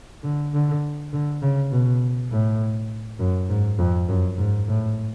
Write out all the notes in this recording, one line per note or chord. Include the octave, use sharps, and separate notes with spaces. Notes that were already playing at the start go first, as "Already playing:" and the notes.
D3
D3
D3
C#3
B2
A2
F#2
G#2
F2
F#2
G#2
A2